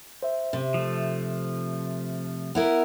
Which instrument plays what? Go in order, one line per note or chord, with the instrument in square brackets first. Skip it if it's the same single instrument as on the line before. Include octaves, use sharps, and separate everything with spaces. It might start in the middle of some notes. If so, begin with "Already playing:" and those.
[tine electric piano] C5 E5
[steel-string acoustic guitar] C3
[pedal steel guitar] F3 A3
[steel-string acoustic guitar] B3 E4 A#4